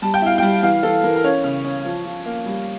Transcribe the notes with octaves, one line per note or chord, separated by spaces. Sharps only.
G3 A5
G5
E4 F5
G3 G5
E3 F5
E3 A4
E3 A#4
A#4
C#4 C#5
C#3
C#4
F3
F3
A#3
G3